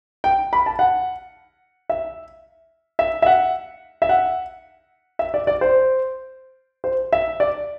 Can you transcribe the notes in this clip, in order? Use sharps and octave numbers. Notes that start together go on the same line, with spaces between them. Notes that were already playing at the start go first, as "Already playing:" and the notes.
G5
B5
A5
F#5
E5
E5
E5
F#5
E5
F#5
E5
D5
D5
C5
C5
E5
D5